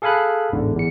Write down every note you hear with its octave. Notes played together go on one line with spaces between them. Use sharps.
G#4 A4 F5 G#5 B5 F#6
A1 E2 G#2 D3
E2 C#7